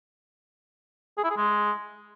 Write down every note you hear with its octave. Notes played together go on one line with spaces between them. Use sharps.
G#4
E4
G#4
G#3